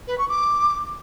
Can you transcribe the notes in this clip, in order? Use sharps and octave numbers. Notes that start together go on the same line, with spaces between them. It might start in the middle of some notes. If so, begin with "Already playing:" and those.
B4
C#6
D6